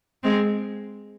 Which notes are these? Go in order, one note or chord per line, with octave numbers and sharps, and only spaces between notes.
G#3 C4